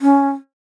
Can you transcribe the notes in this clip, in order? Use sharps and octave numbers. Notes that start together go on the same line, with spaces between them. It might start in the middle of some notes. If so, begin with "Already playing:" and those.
C#4